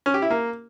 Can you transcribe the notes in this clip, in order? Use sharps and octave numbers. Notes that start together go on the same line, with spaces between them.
C#4
G4
E4
A#3